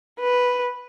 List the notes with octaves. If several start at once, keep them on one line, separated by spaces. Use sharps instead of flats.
B4